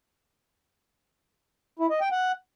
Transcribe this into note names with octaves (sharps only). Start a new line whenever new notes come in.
E4
D#5
G5
F#5